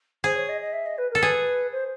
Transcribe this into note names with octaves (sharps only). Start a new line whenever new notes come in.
G#4 C5
C#5
D#5
D#5
E5
D#5
B4
A4 A#4
G#4 B4
C5